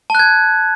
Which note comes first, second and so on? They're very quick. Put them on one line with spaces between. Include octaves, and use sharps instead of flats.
A5 F#6 G#6